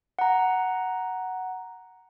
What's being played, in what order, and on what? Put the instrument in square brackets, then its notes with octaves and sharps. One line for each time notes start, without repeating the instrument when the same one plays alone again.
[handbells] F#5 A#5